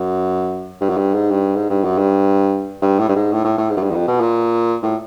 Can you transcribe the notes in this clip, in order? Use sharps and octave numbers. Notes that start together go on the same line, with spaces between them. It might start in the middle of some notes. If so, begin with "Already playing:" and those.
Already playing: F#2
G2
F#2
G2
G#2
G2
G#2
G2
F#2
G2
G2
A2
G2
G#2
A2
A2
A2
G#2
F#2
G2
E2
F2
B2
A#2
A2